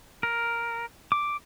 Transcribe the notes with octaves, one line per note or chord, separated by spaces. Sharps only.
A#4
D6